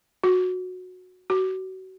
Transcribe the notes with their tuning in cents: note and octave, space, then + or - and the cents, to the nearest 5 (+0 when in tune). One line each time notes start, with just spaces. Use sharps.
F#4 -15
F#4 +30